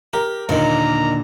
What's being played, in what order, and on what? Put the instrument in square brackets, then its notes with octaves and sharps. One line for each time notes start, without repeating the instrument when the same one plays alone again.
[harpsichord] G4 [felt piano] A#4
[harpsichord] D#2 D#3 [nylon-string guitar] A#2 D3 [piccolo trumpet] A#5